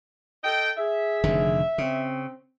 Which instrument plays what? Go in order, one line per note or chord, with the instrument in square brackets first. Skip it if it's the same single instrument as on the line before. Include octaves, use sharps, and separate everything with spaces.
[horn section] A4 D#5 G5
[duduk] G#4 [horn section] E5
[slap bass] F1 D3 D#3
[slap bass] C#3 [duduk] C4